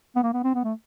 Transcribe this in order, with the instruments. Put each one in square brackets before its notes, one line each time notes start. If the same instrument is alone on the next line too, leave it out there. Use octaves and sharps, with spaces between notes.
[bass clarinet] B3
A#3
B3
C4
B3
A3